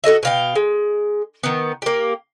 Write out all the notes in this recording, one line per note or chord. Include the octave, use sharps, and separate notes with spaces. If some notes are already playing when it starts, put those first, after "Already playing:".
F#4 A4 D#5 E5
B2 F5 G5
G#3
D#3 B3
A#3 G4